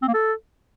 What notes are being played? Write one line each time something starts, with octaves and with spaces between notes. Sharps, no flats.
C4
A#3
A4